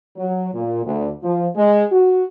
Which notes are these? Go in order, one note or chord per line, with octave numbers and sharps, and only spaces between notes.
F#3
A#2
D2
F3
G#3
F#4